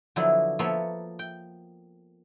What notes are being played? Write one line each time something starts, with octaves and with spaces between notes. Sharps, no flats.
D3 F3 F#3 B3 D4 E4
F3 A#3 B3 A4 C#5 E5
G5